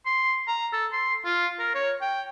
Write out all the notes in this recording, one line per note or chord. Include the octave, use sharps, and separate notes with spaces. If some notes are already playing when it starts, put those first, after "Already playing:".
C6
A#5
A4
C6
F4
A#4
C#5
G5